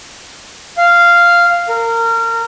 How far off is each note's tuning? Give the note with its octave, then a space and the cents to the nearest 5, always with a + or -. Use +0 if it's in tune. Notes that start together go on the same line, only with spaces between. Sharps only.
F5 -10
A#4 -25